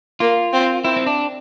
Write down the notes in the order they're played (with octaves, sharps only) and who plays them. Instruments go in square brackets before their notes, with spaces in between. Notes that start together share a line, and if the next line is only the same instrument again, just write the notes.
[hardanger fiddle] A#3 [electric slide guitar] F4
[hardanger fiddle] C4
[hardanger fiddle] C4 [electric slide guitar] E4
[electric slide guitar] C4
D4